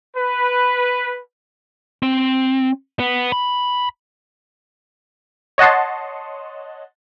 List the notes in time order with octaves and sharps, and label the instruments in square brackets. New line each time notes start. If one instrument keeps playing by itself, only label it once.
[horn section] B4
[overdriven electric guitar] C4
B3
B5
[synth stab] C#5 D#5 F#5 A5 C6